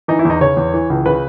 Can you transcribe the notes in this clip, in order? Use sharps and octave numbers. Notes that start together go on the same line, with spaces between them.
E3 D#4
E4
E2 D#4
C#3 C#5
E2
E3
C#2
C#3 B4